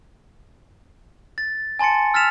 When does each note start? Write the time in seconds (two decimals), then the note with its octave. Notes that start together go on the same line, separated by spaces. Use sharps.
1.38 A6
1.79 G#5 A5 C6 A6 C#7
2.14 E6 F6 A6 B6 E7 F7